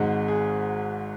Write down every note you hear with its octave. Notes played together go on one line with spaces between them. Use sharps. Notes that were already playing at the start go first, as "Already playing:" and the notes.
Already playing: G#1 G#2 G#3 F#5
G#4